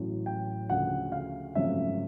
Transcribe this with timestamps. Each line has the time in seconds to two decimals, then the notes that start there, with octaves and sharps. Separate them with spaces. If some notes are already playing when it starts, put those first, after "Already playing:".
Already playing: A1 A2 F#3
0.26 G5
0.70 D2 C#3 F3 F#5
1.12 F5
1.55 G#1 F#2 C#3 F3 A3 E5